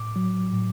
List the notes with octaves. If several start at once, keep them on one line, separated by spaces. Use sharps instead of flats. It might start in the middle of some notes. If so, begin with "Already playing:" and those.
Already playing: A2 D6
F#3
A2